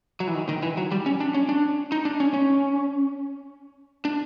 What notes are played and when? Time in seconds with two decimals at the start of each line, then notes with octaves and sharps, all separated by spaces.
0.20 F#3
0.27 E3
0.34 D#3
0.49 D#3
0.62 E3
0.77 F#3
0.92 G3
1.06 C#4
1.20 D4
1.34 C#4
1.49 D4
1.92 D#4
2.05 D4
2.20 C#4
2.34 C#4
4.05 D4